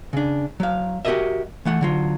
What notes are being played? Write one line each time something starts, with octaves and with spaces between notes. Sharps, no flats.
C#3 D4
F#3 F5
F#4 G4 A4 A#4 D#5 E5
E3 A3 F#5
D3 F#3 F4